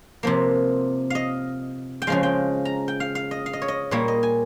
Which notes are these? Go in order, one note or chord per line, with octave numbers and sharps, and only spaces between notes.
C3 F3 A#3
D#5 F5
G5
C#3 F3 G#3 F5
G5
A#5
G5
F5
F5
D#5
F5
D#5
C#5
D#5
A#2 G3 A#3 C#5
D#5
G#5